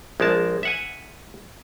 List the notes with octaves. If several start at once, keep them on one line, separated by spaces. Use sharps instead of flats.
A#1 G#3 A#4 A5
E5 F#5 G#5